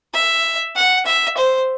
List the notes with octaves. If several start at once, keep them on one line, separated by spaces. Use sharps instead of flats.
E5
F#5
E5
C5